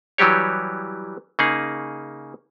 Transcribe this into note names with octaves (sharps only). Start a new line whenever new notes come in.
E3 F#3 G3 G4 C#5
C#3 A#3 D#4 G#4